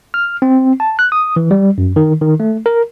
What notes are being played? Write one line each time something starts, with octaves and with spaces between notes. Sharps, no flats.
F6
C4
A5
F#6
D#6
E3
G3
F#2
D#3
D#3
A3
A#4